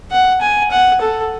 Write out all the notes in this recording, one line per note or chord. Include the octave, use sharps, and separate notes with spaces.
F#5
G#5
F#5
A4